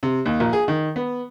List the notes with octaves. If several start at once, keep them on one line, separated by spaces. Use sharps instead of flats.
C3
D#2
A#1
G#4
D#3
B3